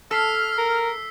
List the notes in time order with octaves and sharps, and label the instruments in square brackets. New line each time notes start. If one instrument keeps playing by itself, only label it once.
[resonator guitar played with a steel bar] A4 [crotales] E6 B6 C7 [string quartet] F6
[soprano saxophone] A#4